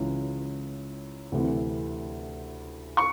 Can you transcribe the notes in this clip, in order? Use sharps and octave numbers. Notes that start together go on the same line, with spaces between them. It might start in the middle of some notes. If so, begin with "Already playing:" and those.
Already playing: C#2 C#3 E3
D2 C3 E3
C#6